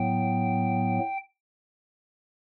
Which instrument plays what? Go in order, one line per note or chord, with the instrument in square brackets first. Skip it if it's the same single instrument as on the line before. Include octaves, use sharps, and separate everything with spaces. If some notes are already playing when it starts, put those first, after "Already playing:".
Already playing: [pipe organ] A2 F#3 B3 G5